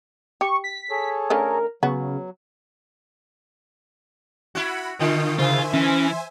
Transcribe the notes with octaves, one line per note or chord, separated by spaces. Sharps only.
G4 C#6
B6
G#4 A4 C#5
D3 A3 C#4 A#4
C#3 F#3 B3 F#4
E4 F#4 F#5 B5
B2 D3 F4 G5 D#6
C#3 F4 C5 E5 G#5
E3 C#4